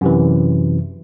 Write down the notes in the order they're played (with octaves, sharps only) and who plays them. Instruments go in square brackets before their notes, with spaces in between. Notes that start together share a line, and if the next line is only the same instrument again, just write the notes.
[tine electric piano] F#2 C3 E3